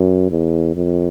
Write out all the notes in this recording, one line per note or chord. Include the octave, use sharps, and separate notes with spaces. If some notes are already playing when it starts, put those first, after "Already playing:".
Already playing: F#2
E2
F2